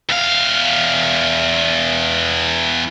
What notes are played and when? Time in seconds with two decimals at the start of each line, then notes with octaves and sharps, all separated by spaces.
0.09 E2 F5